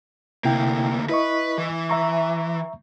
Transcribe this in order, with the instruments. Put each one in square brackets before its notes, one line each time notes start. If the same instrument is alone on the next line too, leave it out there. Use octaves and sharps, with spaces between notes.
[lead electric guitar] D2 A#3 [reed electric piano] C3 E4 G5
[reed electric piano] E4 D#5 C#6 [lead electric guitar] B4
[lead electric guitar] E3
[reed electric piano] E5 A#5 C#6